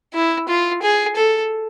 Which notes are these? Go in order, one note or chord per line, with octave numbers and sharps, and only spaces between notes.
E4
F4
G#4
A4